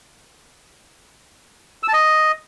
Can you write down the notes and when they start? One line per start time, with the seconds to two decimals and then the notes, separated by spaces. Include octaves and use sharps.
1.83 E6
1.88 A5
1.93 D#5